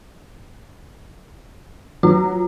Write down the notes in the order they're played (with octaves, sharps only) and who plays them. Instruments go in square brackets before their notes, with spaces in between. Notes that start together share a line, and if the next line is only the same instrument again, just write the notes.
[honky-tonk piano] F#3 [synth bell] F4